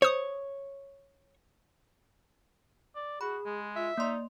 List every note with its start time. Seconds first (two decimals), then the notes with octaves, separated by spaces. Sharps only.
0.02 C5 C#5 D#6
2.96 D5
3.21 F#4 G#4 B5
3.45 G#3
3.76 F4 E5
3.98 A#3 D#4 D5 C6